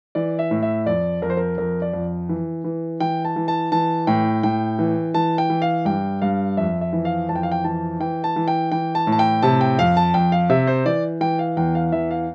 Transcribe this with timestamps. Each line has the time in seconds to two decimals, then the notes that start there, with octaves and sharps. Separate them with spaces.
0.15 E3 D5
0.39 E5
0.51 A2
0.62 E5
0.86 F2 D5
1.22 F2 A#4
1.30 C5
1.37 A#4
1.58 F2 A#4
1.82 D5
1.93 F2
2.29 E3
2.64 E3
3.00 E3 G5
3.25 A5
3.36 E3
3.48 A5
3.72 E3 A5
4.07 A2 G5
4.43 A2 G5
4.79 E3
5.14 E3 A5
5.38 G5
5.50 E3
5.62 F5
5.85 G2 G5
6.21 G2 F5
6.57 F2 E5
6.81 E5
6.93 E3
7.05 F5
7.29 F2 A5
7.36 G5
7.43 F5
7.52 G5
7.64 E3 A5
8.00 E3 G5
8.24 A5
8.36 E3
8.48 G5
8.72 E3 G5
8.95 A5
9.07 A2
9.12 A5
9.19 G5
9.42 C3 A5
9.61 G5
9.79 F2 F5
9.97 A5
10.14 F2 G5
10.32 F5
10.50 C3 E5
10.67 C5
10.85 E3 D5
11.21 E3 G5
11.39 F5
11.57 E2 G5
11.75 F5
11.92 E3 E5
12.11 F5